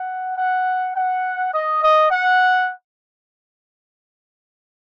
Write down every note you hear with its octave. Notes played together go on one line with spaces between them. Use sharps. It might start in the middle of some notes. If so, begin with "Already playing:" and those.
Already playing: F#5
F#5
F#5
D#5
D#5
F#5